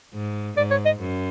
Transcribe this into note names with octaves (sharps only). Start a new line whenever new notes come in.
G#2
G#2 D5
C#5
D#5
F#2